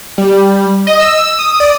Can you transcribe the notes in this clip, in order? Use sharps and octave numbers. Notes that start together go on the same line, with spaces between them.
G3
D#5
E6
D#6
D5